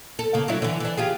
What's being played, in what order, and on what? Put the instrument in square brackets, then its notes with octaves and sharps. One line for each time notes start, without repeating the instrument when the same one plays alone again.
[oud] A4
C#3 A#3
F#3 D4 E4
D3 E3
E3 D4
F4 G4 G#4